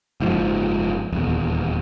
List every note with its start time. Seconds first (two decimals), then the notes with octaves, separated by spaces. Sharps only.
0.20 F#1 G#2 F3
1.12 D#1 E2